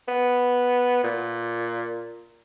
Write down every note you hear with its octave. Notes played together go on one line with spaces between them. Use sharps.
B3
A#2